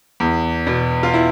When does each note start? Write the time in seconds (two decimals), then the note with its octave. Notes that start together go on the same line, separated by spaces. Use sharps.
0.20 E2
0.67 B2
1.03 F4
1.14 E4